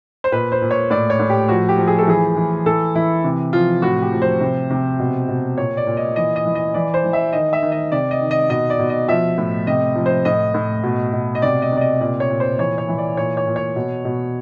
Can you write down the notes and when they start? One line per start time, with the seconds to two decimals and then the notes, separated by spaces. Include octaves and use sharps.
0.24 C5
0.32 A#2 B4
0.52 C5
0.62 A#2
0.71 C#5
0.90 A2 D5
1.10 C#5
1.19 A2
1.30 G4
1.48 F3 F#4
1.69 G4
1.78 F3
1.87 G#4
1.98 A4
2.07 E3 G#4
2.37 E3
2.66 E3 A4
2.95 E3 E4
3.24 C3
3.53 F3 F4
3.82 A2 F#4
4.02 G4
4.12 F3
4.22 C5
4.41 C3
4.70 C3
4.99 B2
5.28 B2
5.58 A#2 C#5
5.77 D5
5.87 A#2
5.97 D#5
6.16 E3 D#5
6.36 D#5
6.46 E3
6.55 D#5
6.74 E3 D5
6.94 C5
7.04 E3
7.13 E5
7.33 D#3 D#5
7.53 E5
7.63 D#3
7.72 D#5
7.92 C3 D5
8.11 D#5
8.21 D#3
8.31 D#5
8.50 B2 D#5
8.70 D5
8.79 B2
8.90 D#5
9.09 F3 E5
9.38 A2
9.67 C3 D#5
9.96 F3
10.06 C5
10.25 A2 D#5
10.54 A2
10.83 B2
11.13 B2
11.35 D#5
11.42 C3 D5
11.62 D#5
11.72 C3 D5
11.81 D#5
12.01 A#2 D5
12.20 C#5
12.30 A#2
12.40 C5
12.59 E3 C#5
12.78 C#5
12.88 E3
12.98 D5
13.17 A#2 C#5
13.37 C#5
13.47 A#2
13.56 C#5
13.76 B2
14.05 B2